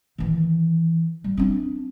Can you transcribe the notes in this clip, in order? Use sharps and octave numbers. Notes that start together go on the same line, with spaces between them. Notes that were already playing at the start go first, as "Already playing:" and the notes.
D#3 E3
G3
C4 D4